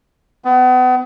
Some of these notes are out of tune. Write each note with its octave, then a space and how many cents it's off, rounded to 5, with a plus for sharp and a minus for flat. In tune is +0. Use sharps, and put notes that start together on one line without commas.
B3 +35